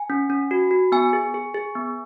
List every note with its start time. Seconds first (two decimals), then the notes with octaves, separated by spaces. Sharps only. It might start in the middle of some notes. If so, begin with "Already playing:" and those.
Already playing: G#5
0.10 C#4
0.30 C#4
0.51 F#4
0.71 F#4
0.92 B3 G#5
1.13 G#4
1.34 G#4
1.54 G#4
1.75 B3